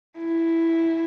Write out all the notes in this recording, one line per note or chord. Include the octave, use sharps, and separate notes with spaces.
E4